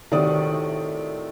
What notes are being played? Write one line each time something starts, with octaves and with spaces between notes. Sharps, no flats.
A2 C3 D#3 F#4 D5 D#6